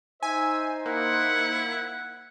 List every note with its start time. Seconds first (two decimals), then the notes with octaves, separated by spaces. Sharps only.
0.23 D#4 C5 E5 G#5
0.86 A#3 E4 F#5